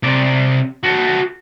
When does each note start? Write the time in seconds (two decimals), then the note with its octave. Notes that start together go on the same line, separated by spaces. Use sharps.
0.03 C3 D5
0.83 F#4 A4